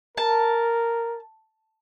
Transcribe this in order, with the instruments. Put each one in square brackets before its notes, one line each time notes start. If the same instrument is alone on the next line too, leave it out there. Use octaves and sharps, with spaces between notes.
[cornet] A#4 [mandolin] A5